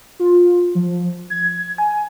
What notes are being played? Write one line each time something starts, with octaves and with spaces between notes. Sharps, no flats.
F4
F3
G#6
G#5